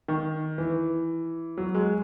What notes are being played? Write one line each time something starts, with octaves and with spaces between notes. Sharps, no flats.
D#3
E3
F#3
G#3